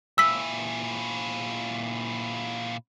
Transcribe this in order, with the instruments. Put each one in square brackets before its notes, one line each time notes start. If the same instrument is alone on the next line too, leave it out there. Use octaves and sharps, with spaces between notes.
[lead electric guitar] A#2 E4 [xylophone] E6 B6